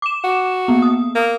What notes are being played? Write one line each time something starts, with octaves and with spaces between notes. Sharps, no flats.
D6 E7
F#4
A#3 B3
D#6
A#3